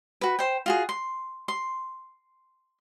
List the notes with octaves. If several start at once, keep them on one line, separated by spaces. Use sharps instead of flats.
F#4 B4
C5 G5
F4 F#4 G#4
C6
C6